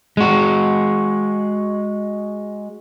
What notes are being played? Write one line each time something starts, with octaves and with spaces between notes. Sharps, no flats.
G#3 F#4